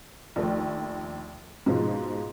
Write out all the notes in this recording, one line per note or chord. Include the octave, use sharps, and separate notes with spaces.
A#1 D#2 A3
G#2 B2 F3 G#3